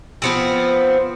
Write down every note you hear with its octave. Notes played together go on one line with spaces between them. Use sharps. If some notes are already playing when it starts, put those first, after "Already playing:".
F3 B3 C4